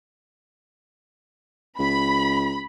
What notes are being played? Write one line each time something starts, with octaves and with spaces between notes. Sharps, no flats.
C#2 B5